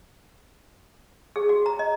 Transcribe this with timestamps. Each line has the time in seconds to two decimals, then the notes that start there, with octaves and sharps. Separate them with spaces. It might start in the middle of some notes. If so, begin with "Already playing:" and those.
1.36 G#4
1.49 F#4
1.66 A#5
1.79 D#5